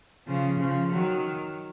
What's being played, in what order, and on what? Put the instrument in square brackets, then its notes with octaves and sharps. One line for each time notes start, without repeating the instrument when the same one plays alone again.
[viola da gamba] C#3 F3
C#3 F3
D#3 F#3